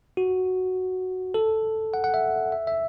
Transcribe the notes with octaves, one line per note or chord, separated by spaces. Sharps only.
F#4
A4
F#5
F#5
E5
E5
E5